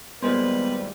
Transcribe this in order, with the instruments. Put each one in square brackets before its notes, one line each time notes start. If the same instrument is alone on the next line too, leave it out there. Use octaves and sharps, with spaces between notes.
[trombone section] G#1 G3 [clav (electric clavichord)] A#2 G#3 C5 [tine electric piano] B3 [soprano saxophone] B4